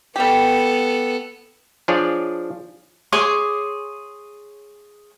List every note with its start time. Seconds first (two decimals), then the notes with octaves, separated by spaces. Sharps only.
0.16 G3 B3 G4 A4
1.88 F3 D4 G#4 C#5 D5
3.12 G#4 C#5 C6 D6